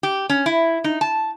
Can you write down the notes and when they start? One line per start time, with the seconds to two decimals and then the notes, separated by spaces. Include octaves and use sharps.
0.03 G4
0.30 C#4
0.46 E4
0.84 D#4
1.01 A5